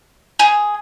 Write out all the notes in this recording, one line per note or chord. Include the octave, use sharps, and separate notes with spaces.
G#4